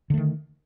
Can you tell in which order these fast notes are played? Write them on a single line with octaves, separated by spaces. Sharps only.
D3 A3 D#3